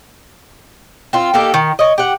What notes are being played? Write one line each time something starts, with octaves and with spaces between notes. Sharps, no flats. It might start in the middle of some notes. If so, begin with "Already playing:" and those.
C4 F4
A#3 D#4 G4 A4
D#3
C#5 D#5
G4 F#5